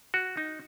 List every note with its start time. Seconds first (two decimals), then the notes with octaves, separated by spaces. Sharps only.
0.14 F#4
0.37 D#4